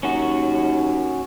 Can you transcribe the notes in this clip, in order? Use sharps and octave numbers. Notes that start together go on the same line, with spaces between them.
D#2 C#4 F#4